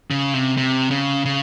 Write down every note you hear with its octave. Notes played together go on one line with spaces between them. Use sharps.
C#3
C3
C3
C#3
C#3